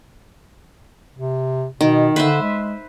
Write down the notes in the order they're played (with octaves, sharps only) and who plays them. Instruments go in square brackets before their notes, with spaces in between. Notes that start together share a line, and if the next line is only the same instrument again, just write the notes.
[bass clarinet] C3
[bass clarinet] B2 [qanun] D#3
[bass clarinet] D3 [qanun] B4 C5 E5
[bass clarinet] G#3